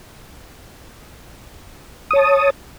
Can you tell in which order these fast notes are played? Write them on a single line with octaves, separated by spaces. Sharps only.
D#6 C#5 A5